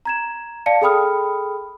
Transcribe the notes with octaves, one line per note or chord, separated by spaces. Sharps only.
A#5 G#6 E7
D5 F5 A5 C#7
G#4 A4 G5 B5 D#6 F6